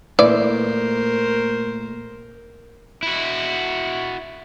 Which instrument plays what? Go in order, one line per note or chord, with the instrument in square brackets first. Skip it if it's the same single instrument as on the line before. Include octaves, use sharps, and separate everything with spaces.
[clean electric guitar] A#2 A3 [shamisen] E3 D5 [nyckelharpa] A#4 C5
[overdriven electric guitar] E4 F#4